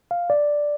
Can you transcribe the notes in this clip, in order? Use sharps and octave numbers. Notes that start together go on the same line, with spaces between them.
F5
D5